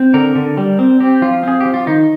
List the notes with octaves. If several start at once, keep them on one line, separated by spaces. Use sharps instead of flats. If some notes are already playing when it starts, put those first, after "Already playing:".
Already playing: C4
D3 A#4
D3
G3
C4
C4 G4
F3 F4
C4 G#4
F3 G4
F4
D#3 D#4